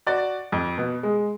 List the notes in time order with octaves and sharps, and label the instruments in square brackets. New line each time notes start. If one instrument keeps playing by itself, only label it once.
[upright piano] F#4 D5
F2
B2
G#3